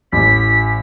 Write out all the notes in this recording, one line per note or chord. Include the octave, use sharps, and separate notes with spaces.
A1 B6